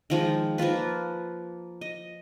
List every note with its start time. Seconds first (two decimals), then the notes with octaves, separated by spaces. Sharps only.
0.10 D#3 F3 G#3
0.58 F3 A#3 F4 B4
1.81 D#5